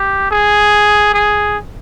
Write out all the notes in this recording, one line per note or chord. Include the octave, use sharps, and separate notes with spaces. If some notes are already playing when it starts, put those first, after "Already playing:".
Already playing: G4
G#4
G#4